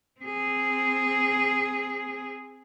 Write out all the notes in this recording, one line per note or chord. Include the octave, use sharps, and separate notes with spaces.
C4 G#4